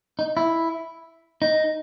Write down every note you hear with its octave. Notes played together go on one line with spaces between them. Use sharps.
D#4
E4
D#4